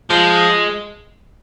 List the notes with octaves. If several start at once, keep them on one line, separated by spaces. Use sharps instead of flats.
F3 G#3